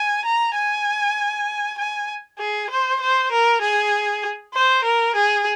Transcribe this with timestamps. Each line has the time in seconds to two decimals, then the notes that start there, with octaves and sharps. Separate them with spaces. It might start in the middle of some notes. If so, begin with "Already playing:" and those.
Already playing: G#5
0.25 A#5
0.55 G#5
1.78 G#5
2.39 G#4
2.70 C5
3.00 C5
3.32 A#4
3.61 G#4
4.54 C5
4.84 A#4
5.15 G#4